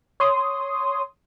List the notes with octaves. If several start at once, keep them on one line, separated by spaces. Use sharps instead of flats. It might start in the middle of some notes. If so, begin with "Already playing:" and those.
C#5 C6 D#6